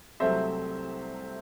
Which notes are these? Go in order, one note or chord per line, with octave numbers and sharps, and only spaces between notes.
C2 C3 F#3 A3 C4 C5 E5